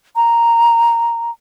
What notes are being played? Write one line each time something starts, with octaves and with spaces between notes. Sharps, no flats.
A#5